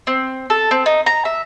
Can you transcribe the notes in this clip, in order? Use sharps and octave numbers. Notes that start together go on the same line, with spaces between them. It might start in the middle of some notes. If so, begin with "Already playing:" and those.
C4
A4
C4
D#4
A#5
E5